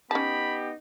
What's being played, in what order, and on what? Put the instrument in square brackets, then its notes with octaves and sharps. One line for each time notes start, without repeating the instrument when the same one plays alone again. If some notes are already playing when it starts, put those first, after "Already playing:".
[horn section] B3 D#4 G4 [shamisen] C#4 A5 [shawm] B5